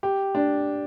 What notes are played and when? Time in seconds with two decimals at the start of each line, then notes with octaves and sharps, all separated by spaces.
0.03 G4
0.35 D4